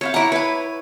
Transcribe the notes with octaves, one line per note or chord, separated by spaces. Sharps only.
C4 E4 C#5 F5
E4 F#5 A#5 D6
B4 C#5 B5